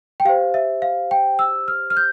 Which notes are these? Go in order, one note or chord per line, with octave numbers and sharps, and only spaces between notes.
G5
G4 C5 F5
E5
F5
G5
E6
F6
F6
G6